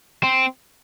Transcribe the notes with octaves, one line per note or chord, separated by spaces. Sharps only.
C4